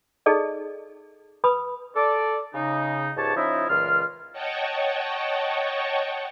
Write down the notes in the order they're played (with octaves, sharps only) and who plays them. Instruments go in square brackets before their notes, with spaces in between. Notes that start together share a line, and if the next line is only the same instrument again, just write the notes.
[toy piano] D#4 G#4 A4 D5 D#5
B4 B5 D#6
[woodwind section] A4 D5
C#3 D#4
C#2 G#2 G4 C#5 A5
F3 C#4 D#4 E4 D#5 E5
C#2 A#2 E3 F4 F6
[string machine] C#5 D#5 F#5 G5 A5 C#6